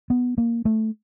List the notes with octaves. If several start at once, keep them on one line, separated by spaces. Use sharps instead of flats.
B3
A#3
A3